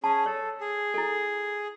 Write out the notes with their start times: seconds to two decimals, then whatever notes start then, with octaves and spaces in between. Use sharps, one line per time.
0.04 C#4 G#4 A5
0.26 A4 C#5
0.61 G#4
0.94 E4 A4